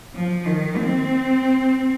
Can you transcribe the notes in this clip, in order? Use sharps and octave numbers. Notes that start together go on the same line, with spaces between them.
F3
D#3
C4